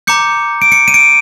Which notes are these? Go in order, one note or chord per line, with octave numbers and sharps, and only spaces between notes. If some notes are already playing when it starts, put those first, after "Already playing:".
A#5 D6 G6 C#7
D7
C#7
D#7
D7